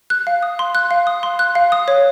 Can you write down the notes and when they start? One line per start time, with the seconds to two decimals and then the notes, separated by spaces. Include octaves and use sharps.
0.10 F#6
0.27 F5
0.43 D#6
0.59 C6
0.75 F#6
0.91 F5
1.07 D#6
1.23 C6
1.39 F#6
1.55 F5
1.72 D#6
1.88 C#5